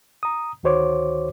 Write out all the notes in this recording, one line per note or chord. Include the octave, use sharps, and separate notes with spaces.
A#5 D#6
D2 D#3 F#4 C5 C#5 D6